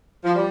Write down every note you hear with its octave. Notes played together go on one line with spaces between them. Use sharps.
F3
G3